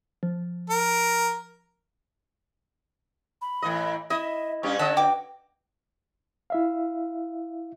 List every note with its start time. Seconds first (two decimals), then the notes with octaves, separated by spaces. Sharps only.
0.23 F3
0.70 A#4
3.42 B5
3.62 A2 E3 D#5
4.10 E4 D#5 E5
4.63 G2 C#4 G4
4.79 D3 C#5 D#5 E5 F#5 A5
4.97 F#4 B4 G5 D6
6.50 E4 E5 F5